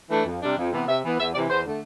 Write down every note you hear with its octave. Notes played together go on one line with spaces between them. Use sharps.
E3 A3 D4
F2
C3 G3 D4
F2
C3 E3 B3
C3 E5
E3 B3
E2 E5
C3 E3 D5
E2 C5
D3 A3